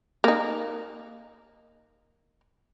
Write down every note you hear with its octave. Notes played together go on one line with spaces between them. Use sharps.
A#3 D#4